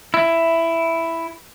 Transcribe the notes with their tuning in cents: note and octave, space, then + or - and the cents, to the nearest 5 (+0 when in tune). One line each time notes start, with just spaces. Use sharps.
E4 +5